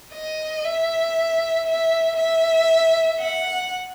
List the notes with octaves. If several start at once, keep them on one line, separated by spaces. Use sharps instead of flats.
D#5
E5
E5
E5
F#5